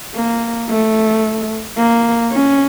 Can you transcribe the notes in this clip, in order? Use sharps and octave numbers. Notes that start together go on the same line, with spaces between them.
A#3
A3
A#3
C#4